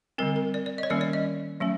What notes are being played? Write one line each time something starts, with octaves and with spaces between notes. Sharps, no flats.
D3 G3 C4 A#4
A#4
D5
D5
D#5
C#5
D#3 G3 A#3 C#4 D5
D5
D#5
F#3 A3 C#4